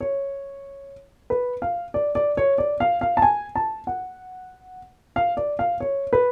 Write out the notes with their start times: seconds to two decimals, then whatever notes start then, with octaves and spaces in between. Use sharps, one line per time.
0.01 C#5
1.30 B4
1.62 F5
1.94 D5
2.15 D5
2.37 C#5
2.58 D5
2.80 F5
3.01 F5
3.17 A5
3.22 G#5
3.56 A5
3.87 F#5
5.16 F5
5.37 D5
5.59 F5
5.80 C#5
6.13 B4